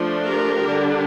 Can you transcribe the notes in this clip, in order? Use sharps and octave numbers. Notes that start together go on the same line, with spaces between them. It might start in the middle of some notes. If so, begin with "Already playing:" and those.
Already playing: F3 A3 D4
G4 A#4
D3 G3 D4